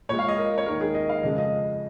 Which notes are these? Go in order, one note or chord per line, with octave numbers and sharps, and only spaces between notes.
A#2 G#3 C#5
F5
D#5
A#4
C#5
D#2 D#3 G#3 A#4
G#4
D#5
F5
F2 C#3 G#3 D#5
D#5